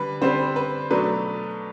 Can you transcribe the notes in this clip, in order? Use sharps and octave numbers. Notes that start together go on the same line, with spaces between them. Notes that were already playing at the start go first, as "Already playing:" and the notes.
Already playing: D3 G3 B4
D3 G3 C4 C5
B4
B2 F#3 A3 D4 B4